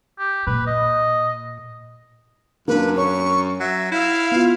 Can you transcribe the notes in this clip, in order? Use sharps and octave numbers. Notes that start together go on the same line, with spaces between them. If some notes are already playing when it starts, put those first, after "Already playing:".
G4
A#2 B4
D#5
F#2 A#3 D4 B4
C#5 C#6
F#3 E5
E4 F5
B3 F4